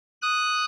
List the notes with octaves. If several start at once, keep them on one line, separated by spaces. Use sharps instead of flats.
D#6 F#6